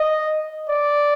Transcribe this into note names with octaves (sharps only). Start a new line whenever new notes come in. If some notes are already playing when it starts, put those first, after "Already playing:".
Already playing: D#5
D5